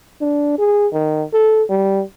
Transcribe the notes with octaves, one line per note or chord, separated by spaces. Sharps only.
D4
G#4
D#3
A4
G3